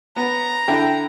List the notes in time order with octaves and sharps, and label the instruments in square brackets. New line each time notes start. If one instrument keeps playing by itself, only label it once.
[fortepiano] B3 [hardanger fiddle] A#5
[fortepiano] D3 E4 [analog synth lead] G5